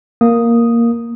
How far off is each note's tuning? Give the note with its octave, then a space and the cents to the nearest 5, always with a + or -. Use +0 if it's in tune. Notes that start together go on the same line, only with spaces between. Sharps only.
A#3 +0 D#6 +0